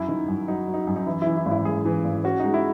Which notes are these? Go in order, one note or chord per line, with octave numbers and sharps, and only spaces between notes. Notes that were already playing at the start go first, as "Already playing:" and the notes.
Already playing: F#2 E4
D#3
F#2
F#3 D#4
F#3
D#4
F#2
D#4
E3 E4
E3 E4
E4
G#1
E4
G#1 G#4
E3
G#1
C#4 F#4
G#3 D#4
E4